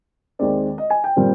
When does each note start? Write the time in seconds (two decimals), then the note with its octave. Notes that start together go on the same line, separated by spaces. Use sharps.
0.39 D#2 D#3 G#3 C4 D5
0.78 D#5
0.90 G#5
1.04 G5
1.16 A#2 G3 C4